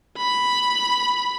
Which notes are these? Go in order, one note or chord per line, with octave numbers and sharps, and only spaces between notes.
B5